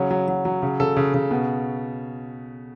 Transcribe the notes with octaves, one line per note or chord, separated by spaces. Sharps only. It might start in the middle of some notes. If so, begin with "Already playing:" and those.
Already playing: C#3 F#3 C#5
F#3
F#3
F#3
C#3
C#3 A4
C#3
C#3
B2